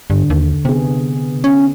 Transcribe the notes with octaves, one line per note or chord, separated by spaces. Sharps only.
G2 D3
D#2
C3 B3 G#4
C#4